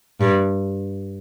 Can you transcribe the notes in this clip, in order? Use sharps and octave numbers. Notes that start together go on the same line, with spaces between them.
G2